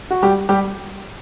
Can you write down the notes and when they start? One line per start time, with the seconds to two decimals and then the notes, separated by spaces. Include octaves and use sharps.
0.11 F#4
0.23 G3 G4
0.49 G3 G4